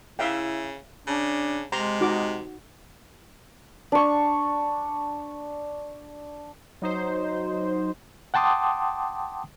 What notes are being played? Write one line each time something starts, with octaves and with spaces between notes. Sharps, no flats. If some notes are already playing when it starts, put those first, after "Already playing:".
C#3 E4 E5 F5 G5
C#3 D4
C3 G#3 A#5 C6
D#4 F#4 D6
D4 C#6
F#3 D#4 C5
F#5 G5 A5 C6 D6 D#6